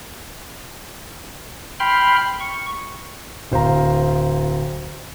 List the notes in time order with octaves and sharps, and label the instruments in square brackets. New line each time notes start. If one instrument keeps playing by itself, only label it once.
[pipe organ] G5 B5 C6 F6
C#6
[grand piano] D1 C5 F5 A#5